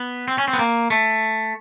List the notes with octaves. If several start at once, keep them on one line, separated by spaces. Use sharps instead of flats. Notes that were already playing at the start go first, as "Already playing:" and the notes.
Already playing: B3
C4
C#4
C4
B3
A#3
A3